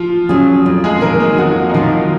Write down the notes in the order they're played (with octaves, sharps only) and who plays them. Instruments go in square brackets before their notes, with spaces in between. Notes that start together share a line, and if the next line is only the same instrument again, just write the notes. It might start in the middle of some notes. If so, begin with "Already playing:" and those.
Already playing: [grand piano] F3 F4
[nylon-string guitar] F#3 C#4 G#4
F2
[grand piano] G#3 G#4
[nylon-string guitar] D#3 F#3 [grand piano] A#3 A#4
[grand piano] G#3 G#4
[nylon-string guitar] F2 [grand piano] F#3 F#4
[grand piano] D#4
[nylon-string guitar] D#3 F#3 [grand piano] F3 F4